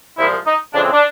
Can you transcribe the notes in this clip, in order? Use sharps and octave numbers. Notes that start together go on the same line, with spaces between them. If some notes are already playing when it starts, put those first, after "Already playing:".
C2 A#2 F3 G#3 E4
D#4
F2 C#3 E3 G#3 D4
C4
D4